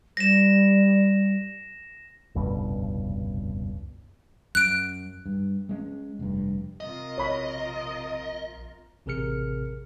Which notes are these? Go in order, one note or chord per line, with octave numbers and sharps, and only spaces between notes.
G3 A#6 E7
F1 C#2 G2 B2
F#2 F#6 D7
G2
G#3 B3 C#4
F1 G2
C3 F4 A#4 D#5
A#1 C#5 B5
A1 C3 G#4 A#4 F6 C#7